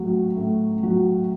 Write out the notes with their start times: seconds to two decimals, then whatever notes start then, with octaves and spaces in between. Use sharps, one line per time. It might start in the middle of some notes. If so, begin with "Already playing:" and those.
Already playing: A2 F#3
0.37 A2
0.83 F#3